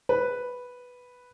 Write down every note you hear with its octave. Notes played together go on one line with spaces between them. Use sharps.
B4